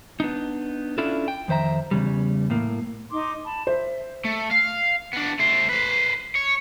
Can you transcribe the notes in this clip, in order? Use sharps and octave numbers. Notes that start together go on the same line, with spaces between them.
B3 D4 D#4
C#4 D4 E4 F4 A4
G5
F2 D#3 C5 E5 A#5
E2 C#3 G3
A2 A#3
D#4 C6 D6
A5 B5
C5 E5
A3
F5
B3 D4
A3 C5
B4 C5
C#5